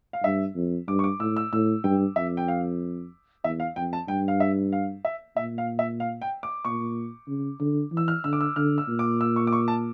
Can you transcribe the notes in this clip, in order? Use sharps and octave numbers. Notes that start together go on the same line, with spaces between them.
F5
G2 E5
F2
G2 D6
C#6
D6
A2 E6
E6
A2 E6
G2 G5
F2 E5
G5
F5
E2 E5
F5
F2 G5
A5
G2 G5
F5
E5
F5
E5
A#2 E5
F5
E5
F5
G5
D6
A#2 C#6
C#3
D3
E3 E6
F6
D3 E6
D6
E6
D3 F6
E6
A#2
D6
E6
C#6
D6
C#6
A5